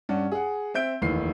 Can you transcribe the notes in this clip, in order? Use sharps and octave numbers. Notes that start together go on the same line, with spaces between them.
G2 C#4 D5 F#5
G#4 F#5
C4 E5 G6 D7
F1 D#2 D#3 E3 C7